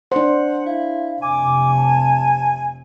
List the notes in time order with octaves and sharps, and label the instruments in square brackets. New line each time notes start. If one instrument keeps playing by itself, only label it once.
[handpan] D4 C5 [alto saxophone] F#5
[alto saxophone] E4 [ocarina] F5
[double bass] F1 C3 [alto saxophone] G#5 [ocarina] D6
[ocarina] A5